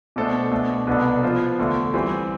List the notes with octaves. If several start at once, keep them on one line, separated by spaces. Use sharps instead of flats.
B2 A3 D4 A4 C5
B2 A3 D4
C2 B2 B3 D4 A4
F3 B3 F4 C5
E2 D3 A3
E3 G3 C4